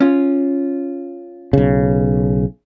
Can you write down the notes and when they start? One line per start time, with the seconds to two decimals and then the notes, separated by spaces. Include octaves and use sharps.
0.01 C#4 F4
1.53 B1 C#3